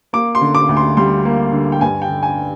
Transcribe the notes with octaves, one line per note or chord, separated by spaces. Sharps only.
A#3 D6
C6
D3
D6
D2
C6
G3 C6
A#3
D3
G5
G2 G#5
G5
D3
G#5